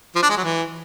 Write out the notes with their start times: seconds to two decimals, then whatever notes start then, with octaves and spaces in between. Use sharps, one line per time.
0.15 F3
0.23 D4
0.30 G#3
0.37 F#3
0.44 E3